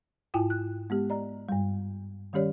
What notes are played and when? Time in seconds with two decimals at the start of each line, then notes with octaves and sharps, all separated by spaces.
0.34 G#2 E4 F4 G5 G#5
0.50 F#6
0.90 G#3 B3 G4
1.10 D5 D#5 A#5
1.49 G2 G3
2.33 D#3 G3 C#4 G4 C#5 D5